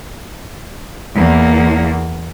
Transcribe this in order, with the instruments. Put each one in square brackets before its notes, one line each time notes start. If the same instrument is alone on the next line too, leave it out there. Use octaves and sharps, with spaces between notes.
[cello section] E2 A#3